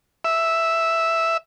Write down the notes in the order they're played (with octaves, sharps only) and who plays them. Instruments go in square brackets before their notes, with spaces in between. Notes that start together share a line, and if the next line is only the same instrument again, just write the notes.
[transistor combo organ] E5